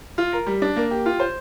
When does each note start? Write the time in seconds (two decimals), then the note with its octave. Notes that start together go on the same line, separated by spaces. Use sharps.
0.18 F4
0.32 A#4
0.46 G3
0.62 D4
0.76 A#3
0.91 G4
1.06 F4
1.20 C5